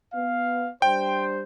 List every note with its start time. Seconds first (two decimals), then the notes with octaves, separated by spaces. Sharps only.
0.14 B3 F5
0.82 G3 D4 C5 G5